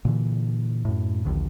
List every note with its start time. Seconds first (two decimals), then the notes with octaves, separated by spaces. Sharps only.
0.05 A#2 D3 E3
0.85 F#2 A2
1.25 A#1 D#2 D3